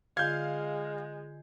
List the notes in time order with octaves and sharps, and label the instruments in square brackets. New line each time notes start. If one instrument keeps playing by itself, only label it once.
[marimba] D3 F4 [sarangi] G#3 [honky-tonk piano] F5 [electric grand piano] G6 G#6